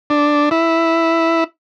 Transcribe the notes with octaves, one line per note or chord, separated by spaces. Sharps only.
D4
E4